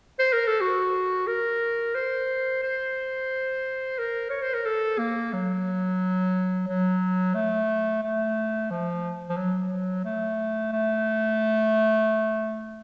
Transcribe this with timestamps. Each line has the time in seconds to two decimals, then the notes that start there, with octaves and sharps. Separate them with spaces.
0.19 C5
0.33 A#4
0.47 A4
0.61 F#4
1.28 A#4
1.95 C5
2.63 C5
3.99 A#4
4.30 C#5
4.42 C5
4.54 A#4
4.66 A4
4.99 A#3
5.33 F#3
6.68 F#3
7.35 A3
8.02 A3
8.71 F3
9.29 F3
9.37 F#3
10.05 A3
10.72 A3